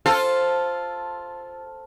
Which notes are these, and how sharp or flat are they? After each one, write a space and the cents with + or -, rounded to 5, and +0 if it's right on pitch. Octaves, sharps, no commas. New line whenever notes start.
F4 +0 A4 +0 C5 +5